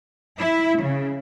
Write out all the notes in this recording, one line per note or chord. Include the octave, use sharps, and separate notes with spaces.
E4
C#3